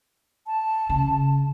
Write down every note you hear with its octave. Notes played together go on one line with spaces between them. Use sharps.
A5
C#3